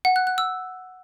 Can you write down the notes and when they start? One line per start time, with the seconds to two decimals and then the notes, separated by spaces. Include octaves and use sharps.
0.05 F#5
0.16 F#6
0.27 F#6
0.38 E6